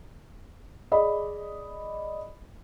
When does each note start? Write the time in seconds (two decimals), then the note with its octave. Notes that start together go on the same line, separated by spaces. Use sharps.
0.91 G#4 D5 D#5 B5